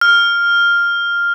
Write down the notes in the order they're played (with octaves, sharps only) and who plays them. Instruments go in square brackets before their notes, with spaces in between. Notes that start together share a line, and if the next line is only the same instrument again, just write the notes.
[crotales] F6